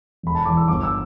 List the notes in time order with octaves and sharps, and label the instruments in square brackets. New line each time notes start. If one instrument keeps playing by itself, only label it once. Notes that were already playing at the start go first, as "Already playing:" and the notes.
[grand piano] E1 B5
A5
E2 E3 D6
E6
G1 D6
E6